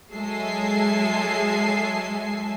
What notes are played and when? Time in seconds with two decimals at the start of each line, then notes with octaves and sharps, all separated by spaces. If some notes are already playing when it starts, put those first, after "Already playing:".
0.12 F#3 G#3 A4 E5 G#5 C7